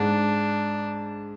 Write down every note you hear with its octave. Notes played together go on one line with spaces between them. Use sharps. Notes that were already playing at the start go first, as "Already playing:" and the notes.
Already playing: G#2 D4